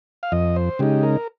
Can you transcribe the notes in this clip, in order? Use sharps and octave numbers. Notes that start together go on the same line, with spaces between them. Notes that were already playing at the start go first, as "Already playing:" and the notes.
F5
F2 D#5
C5
C#3 G#3 D#4 G4
A#4